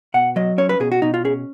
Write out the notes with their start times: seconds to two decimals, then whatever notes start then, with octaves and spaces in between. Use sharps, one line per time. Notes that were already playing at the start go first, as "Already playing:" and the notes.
0.14 B2 F#5
0.36 F#3 D#5
0.58 C#4 C#5
0.69 B4
0.80 B2 G#4
0.92 F#4
1.02 B2 D#4
1.14 F4
1.25 C#4 G#4